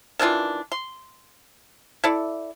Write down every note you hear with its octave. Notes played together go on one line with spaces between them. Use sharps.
D#3 E3 D4 F4
C6
E4 A4 D5